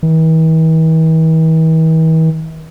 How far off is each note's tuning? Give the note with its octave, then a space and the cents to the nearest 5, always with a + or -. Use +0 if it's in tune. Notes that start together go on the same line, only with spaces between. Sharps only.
E3 -45